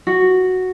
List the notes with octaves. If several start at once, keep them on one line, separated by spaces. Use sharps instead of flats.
F#4